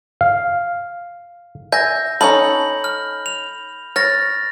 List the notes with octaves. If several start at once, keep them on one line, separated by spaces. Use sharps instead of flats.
F5
E5 G#5 G6 A#6
C#4 D#4 A4 B5 F#7
F6
F7
C#5 F6 A6 A#6